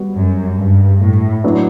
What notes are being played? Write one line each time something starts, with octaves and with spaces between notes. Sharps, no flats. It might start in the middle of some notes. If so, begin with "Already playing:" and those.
Already playing: G3 B3 F#4
F#2
G2
A2
A2 F#3 B3 D4